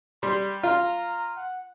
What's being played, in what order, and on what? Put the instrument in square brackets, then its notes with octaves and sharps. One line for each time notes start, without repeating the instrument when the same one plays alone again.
[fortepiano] G3 [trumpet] C6
[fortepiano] F4 [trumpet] A#5
[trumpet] F#5